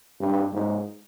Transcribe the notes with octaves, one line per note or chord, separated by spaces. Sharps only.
G2
G#2